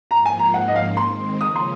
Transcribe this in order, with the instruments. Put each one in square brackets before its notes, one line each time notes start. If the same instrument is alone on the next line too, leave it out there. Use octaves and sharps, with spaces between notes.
[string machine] G#2 F3 A#3 F4 [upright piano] A#5
[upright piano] G#5
A#5
[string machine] G#2 F3 A#3 C#4 [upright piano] F#5
[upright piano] D#5
F5
[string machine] D#3 G#3 C4 [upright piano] C6
[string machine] C#3 F3 A#3 C#4 [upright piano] D#6
[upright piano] C6